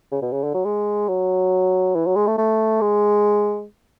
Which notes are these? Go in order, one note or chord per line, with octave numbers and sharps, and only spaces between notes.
C#3
B2
C#3
D3
F#3
G#3
F#3
E3
F#3
G#3
A3
A3
G#3